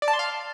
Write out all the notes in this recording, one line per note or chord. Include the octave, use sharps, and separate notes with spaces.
D5
A5
C6
F5